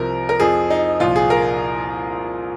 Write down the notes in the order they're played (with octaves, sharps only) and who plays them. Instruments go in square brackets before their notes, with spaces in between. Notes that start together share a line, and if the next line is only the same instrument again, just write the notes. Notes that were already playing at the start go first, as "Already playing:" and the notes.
Already playing: [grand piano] C2 C3 F3 A#4
A#4
F2 F3 G#4
D#4
C2 A#2 F3 F4
G#4
A#4